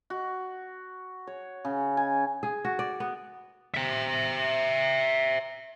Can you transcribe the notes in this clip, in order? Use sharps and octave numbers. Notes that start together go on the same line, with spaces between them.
F#4
C#5
C#3
G#5
G#4
F#4
D5
B3
C5 E5